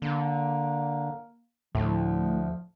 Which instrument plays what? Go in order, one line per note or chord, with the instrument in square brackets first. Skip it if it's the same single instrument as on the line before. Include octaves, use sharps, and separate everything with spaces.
[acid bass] D3 [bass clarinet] A#3
[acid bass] D2 [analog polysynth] A2 [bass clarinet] F3